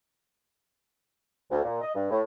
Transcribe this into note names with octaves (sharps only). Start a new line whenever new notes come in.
D2
A#2
D#5
G2
A2